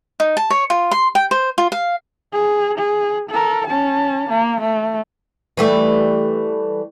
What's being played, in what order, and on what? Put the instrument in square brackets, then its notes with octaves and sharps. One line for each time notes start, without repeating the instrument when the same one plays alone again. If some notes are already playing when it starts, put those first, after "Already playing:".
[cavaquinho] D#4
A5
C#5
F4
C6
G5
C5
F4
F5
[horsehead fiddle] G#4
G#4
A4 A#4
C#4 A5
A#3
A3
[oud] E3 G3 A3